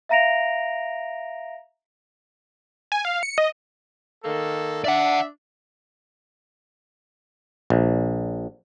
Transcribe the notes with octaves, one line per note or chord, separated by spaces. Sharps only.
E5 F5 A#5 A#6 D7 F7
G#5
F5
C#7
D#5
D#3 A#3 A4
D4 D5 E5 F#5
A#1